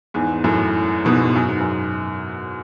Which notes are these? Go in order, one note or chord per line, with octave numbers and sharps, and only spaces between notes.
E2 G#2
F#2 A2
G#2 B2
F#2
G#2
F#2